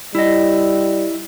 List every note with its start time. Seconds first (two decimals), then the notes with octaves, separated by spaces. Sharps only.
0.15 G3 E4 D#5